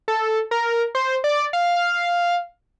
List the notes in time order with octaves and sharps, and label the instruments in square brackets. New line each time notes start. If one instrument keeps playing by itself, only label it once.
[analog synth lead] A4
A#4
C5
D5
F5